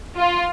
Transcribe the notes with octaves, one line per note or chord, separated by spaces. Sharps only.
F4